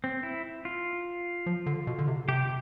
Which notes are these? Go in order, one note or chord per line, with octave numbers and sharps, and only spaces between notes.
C4
E4
F4
F3
D3
B2
D3
C3
C3 G4